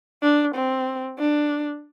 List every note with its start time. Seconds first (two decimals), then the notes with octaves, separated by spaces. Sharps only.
0.22 D4
0.54 C4
1.18 D4